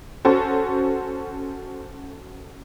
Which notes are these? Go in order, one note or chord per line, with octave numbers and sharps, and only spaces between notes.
C#4 F#4 A4 C5